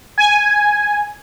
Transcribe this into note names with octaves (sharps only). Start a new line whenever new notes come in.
G#5